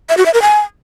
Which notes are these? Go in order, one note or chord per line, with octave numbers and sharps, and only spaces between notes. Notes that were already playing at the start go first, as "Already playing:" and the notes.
E5
F#4
E5
A#4
G#5